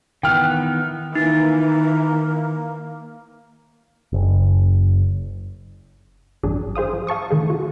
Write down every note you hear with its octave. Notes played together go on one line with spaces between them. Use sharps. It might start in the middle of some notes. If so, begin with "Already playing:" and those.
D#3 E3 B3 G5 F6
D#3 E3 A#3 D#4
F#1
A1 G2 F#3 D4 G#4
G#4 C5 F5 D#6
F3
F5 A5 C#6 D#6
D#3 A3 G#4
F4 F#4